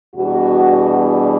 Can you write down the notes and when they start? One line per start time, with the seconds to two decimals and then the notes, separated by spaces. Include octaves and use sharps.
0.14 E2 B2 G3 B3 D4 F#4